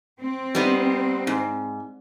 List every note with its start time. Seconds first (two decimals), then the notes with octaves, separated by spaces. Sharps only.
0.21 C4
0.55 G3 B3 D#4
1.27 G#2